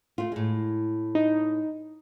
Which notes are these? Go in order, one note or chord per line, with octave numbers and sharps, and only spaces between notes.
A3 F4
A2 G#3
D#4